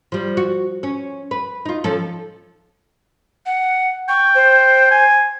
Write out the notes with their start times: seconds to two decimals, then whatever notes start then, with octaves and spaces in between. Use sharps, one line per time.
0.12 F3 G3
0.37 F#4
0.83 C#4
1.31 B4
1.65 D#4 F4
1.84 F3 C#4 A4
3.46 F#5
4.09 G5 C#6
4.35 C5
4.91 G#5